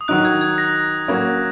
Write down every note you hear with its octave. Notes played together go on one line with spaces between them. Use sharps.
D#6
D#3 F#3 D#4 F#6
G#6
G#6
A#6
F#3 A#3 C#4